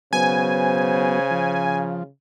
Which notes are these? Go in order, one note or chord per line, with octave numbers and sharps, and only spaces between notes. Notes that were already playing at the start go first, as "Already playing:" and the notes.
C#3 F#3 B3 C5 G#5
F3